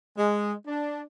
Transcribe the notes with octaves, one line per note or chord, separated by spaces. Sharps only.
G#3
D4